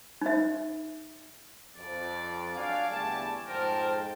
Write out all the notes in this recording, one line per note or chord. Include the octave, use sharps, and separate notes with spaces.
D#4 E5
F2 D5
F#3 D4 F5 G#5 D6
E2 D3 G3 A3 A5
F2 G#2 A#4 C5 G5 A5